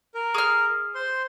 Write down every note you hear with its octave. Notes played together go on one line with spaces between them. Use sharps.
A#4
G#4 F6
C5 C6